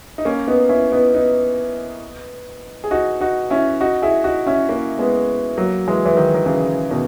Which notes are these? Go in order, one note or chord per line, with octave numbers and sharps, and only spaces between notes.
D#4
A#3 C#4
B3 D#4
C#4 E4
B3 D#4
B3 D#4
G#4
D#4 F#4
D#4 F#4
C#4 E4
D#4 F#4
E4 G#4
D#4 F#4
C#4 E4
A#3 C#4
G#3 B3
F#3 A#3
E3 G#3
E3
D#3 F#3
D#3
C#3 E3
B2 D#3